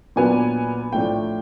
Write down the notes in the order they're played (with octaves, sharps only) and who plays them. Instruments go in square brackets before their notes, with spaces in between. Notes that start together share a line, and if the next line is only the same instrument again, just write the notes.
[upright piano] A#2 F#3 B3 D4 G#5
A2 F3 A3 D4 G5